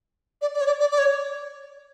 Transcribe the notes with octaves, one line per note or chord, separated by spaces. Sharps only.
D5
D5
C#5
D5
D5
D5
C#5